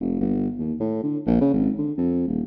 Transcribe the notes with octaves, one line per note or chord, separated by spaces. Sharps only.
F1
G1
D#2
A2
D3
A#1
C#3
G#1
D3
F2
D#1